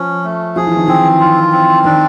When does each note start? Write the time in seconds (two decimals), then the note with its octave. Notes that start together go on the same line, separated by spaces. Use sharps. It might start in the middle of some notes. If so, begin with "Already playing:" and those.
Already playing: F3 C#4
0.24 A3
0.56 F3 G#4
0.67 E3
0.77 D#3
0.88 E3 C4
1.20 F4
1.53 C4
1.85 D#3 D4